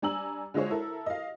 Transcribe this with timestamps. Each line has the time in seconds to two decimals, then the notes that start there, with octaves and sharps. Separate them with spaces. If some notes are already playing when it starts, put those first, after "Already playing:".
0.02 G3 D4 G#5 A#5 E6 F#7
0.54 D3 G#3 F4 G#4 C5 C#5
0.70 E4 A4 A#4
1.06 D#5 F5